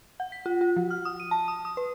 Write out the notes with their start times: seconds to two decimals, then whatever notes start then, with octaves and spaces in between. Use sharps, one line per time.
0.20 F#5
0.32 B6
0.46 F4
0.61 F4
0.76 F3
0.91 F6
1.05 D#6
1.20 D#7
1.31 A5
1.48 D#6
1.65 D#6
1.77 B4